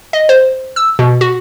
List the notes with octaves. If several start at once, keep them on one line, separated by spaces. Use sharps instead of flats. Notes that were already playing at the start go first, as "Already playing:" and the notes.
D#5
C5
E6
B2
F#4